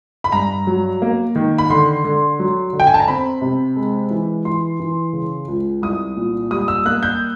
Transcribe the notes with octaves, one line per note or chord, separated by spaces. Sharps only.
B5
G2 A#5
F#3
A#3
D#3
B5
D3 C6
D3
F#3
D3
G5
G#5
A5
A#5
C4 B5
C3
G#3
E3
E3 C6
E3
C#3
C#2
C2 D#6
A#2
G3 D#6
E6
A#3 F#6
G6